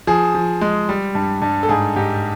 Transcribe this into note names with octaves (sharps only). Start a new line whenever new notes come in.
F3 G#4
F3
G#3
G3
G2
G2
A4
G#2 G#4
G#2 G4